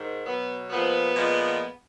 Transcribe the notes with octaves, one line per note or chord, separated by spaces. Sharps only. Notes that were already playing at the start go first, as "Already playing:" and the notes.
Already playing: G#2 D#3
B2 F#3 B3
A#2 F3 G#3 B3
A#2 F3 G#3